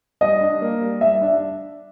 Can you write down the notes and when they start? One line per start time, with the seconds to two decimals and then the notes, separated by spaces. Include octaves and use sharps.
0.21 G3 D#5
0.41 D4
0.62 A#3
0.81 G3
1.01 G3 E5
1.22 D4
1.28 E5